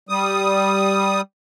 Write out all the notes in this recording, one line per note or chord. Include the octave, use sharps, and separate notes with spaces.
G3 D#6